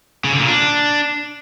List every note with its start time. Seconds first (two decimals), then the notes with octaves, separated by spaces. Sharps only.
0.24 C#3
0.32 D3
0.40 A#2
0.48 D4